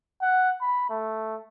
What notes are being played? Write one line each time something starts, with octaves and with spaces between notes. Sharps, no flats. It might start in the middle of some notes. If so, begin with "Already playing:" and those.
F#5
B5
A3